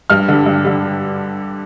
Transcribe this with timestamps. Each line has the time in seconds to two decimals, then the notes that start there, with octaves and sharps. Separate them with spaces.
0.10 G2 F6
0.28 D3 G3
0.46 G2
0.64 D3 G3